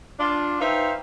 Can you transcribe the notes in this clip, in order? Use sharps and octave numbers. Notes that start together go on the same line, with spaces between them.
D4 F4
D#4 B4 C5 E5 F5 G5